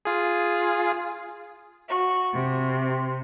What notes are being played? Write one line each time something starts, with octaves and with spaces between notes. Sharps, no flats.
F4 G#4
F#4
C3